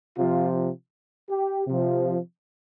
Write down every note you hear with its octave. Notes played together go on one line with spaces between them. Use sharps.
C3 F3 F4
G4
C3 F3